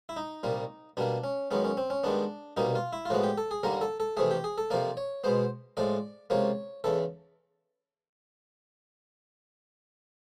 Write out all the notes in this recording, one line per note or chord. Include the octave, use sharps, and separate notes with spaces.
E4
D#4
C2 A#2 G3 A#3
B2 G3 A#3 D4
C#4
F#2 D#3 G#3 B3 C#4
C#4
C4
C#4
G2 D#3 G#3 B3 D4
C2 B2 G3 A#3 D#4
F4
E4
F4
A2 F3 G#3 B3 F#4
G4
A4
G#4
D#2 D3 G3 A#3 A#4
A4
A4
F2 C3 E3 A3 G#4
G4
G#4
A4
F2 C3 F3 A#3 D5
C#5
B2 G#3 B3 C5
A2 F3 G#3 D5
C#2 C3 F3 A#3 C#5
E2 C#3 E3 A4